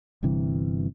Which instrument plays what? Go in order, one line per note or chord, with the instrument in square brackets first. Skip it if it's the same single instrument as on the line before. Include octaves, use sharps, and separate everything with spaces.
[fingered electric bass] G1 G2 C3 E3